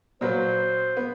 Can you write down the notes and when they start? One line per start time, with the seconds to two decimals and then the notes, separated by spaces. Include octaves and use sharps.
0.21 A#2 F#3 B4 C5
0.97 B3